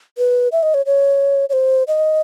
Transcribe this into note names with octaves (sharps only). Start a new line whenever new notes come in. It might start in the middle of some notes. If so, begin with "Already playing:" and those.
B4
E5
D#5
C#5
C#5
C#5
C5
D#5